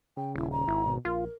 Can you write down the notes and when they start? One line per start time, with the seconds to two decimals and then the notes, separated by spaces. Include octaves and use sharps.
0.17 C#3 G5
0.36 D#1 E4
0.51 A#5
0.68 G#1 E4
0.87 B2
1.05 A#1 F4 A#4